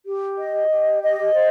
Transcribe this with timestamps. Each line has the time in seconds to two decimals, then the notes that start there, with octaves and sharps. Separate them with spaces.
0.06 G4
0.38 D#5
0.70 G4
1.03 D#5
1.35 C5